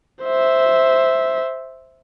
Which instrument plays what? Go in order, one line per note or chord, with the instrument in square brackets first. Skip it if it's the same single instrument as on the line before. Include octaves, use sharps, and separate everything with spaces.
[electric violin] C5 E5